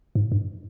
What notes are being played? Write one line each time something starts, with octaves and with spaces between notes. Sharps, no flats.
G#2
G2